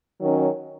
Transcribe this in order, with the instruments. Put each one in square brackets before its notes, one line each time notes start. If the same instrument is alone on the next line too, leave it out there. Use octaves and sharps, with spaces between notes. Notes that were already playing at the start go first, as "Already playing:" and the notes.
[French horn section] D#3 F#3 C#4